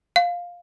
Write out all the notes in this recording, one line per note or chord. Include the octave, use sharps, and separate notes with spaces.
F5